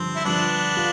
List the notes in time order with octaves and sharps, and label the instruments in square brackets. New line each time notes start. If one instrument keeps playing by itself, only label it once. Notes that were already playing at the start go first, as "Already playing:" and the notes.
Already playing: [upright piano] G2 D3 F3 [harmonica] C4
[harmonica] E4
[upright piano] G2 D3 F3 [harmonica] B3 D4
[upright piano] F4